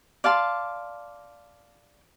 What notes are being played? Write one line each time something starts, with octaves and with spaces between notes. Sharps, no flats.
D5 F5 A5 C6